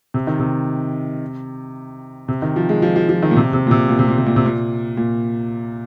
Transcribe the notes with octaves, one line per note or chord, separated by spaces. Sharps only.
C3
D#3
C3
C3
D#3
F3
G#3
F3
F3
F3
D#3
A#2
C3
C3
A#2
C3
A#2
C3
A#2
C3
A#2
C3
A#2
A#2